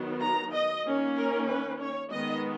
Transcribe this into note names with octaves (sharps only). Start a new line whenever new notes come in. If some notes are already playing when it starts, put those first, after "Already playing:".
Already playing: D#3 F#3 B3
A#5
D#5
D#3 A#3 C#4
A#4
B4
C#5
D#3 G#3 B3 D#5